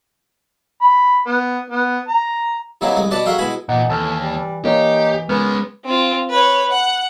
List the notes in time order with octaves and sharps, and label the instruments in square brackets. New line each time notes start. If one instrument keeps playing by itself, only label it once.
[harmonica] B5
B3
B3
A#5
[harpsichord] C3 F#3 A#3 D#4 E4 G#4
C2 G#3 G#4
B2 B4 D5 D#5 A5
F#4 G#4 A#4 E5 F5 G5
B2 G#3 E4 G#5 B5
[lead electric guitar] A#2 [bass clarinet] E3 [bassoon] D#4 [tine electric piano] F#5
[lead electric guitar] D#2 [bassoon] A2 [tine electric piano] A5 E6 F6
[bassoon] G3
[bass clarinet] E3 [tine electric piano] A#3 A#4 C#5 [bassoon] D#4 [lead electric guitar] G4
[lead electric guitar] G#3 C#4 [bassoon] B3 [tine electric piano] A#4 F6
[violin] C4 F4
B4 C#5
F#5